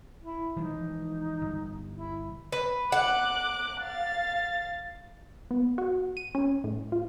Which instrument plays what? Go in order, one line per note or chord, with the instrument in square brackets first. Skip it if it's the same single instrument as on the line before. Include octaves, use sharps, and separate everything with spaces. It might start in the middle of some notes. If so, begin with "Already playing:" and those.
[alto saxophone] E4
[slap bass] E3 F3 G#3 [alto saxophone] D#4
[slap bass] G1
[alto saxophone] E4
[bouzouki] B4
[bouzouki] F#5 [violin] D6 F#6
[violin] F5 A6
[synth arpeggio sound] B3
F#4
D#7
C#4
A2
F4